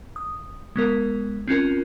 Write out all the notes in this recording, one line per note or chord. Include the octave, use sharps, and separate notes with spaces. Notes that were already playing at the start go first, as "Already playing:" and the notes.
D#6
G#3 B3 A#4
C4 C#4 F4 A#4